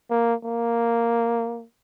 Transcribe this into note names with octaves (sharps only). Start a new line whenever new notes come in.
A#3
A#3